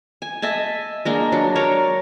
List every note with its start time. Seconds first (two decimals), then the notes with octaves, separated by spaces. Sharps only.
0.22 G#5
0.42 D#5 E5 G#5 A5
1.05 G#3 A#3 D4
1.32 F#3 D4
1.56 A#4 C#5 A5